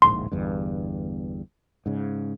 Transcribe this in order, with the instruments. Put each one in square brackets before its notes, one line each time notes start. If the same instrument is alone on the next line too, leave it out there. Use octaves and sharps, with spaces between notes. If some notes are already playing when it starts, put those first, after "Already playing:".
[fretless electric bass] D1 A#1 G#2 [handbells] C6
[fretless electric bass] G1 E2 G2
G#2 C#3